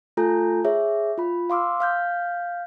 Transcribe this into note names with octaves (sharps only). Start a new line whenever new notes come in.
A3 F4 A4 G#5 A#5 G6
G#4 C#5 E5
F4 B5
F5 C6 D6 E6 F6
F5 F6 G6